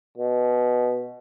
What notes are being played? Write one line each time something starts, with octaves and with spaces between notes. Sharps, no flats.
B2